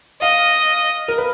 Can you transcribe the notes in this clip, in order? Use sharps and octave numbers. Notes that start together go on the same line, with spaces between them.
D#5 F5
A#4
B4